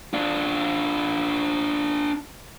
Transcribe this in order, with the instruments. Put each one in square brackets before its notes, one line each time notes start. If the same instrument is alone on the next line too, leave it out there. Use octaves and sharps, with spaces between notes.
[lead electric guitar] D4 F4